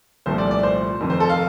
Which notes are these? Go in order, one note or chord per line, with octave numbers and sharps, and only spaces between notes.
C2 A#2 F3 A3 C5
D5
D5
C5
F1 F2 D#3
C5
A4
F5